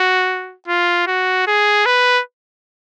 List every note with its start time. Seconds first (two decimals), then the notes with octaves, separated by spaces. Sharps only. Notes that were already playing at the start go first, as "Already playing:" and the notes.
Already playing: F#4
0.68 F4
1.07 F#4
1.47 G#4
1.86 B4